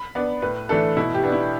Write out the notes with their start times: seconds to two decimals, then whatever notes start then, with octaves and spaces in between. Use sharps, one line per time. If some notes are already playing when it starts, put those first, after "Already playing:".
Already playing: B5
0.15 B3 D4 D5
0.42 A2 B4
0.69 E3 A3 D4 A4
0.97 B2 E4
1.14 G4
1.24 B3 D4
1.32 E4